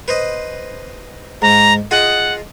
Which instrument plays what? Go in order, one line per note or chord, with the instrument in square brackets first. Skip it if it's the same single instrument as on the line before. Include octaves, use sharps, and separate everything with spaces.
[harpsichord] B4 C5 D#5
[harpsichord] G#2 [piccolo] A#5
[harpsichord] F4 G#4 D#5 [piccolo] F#5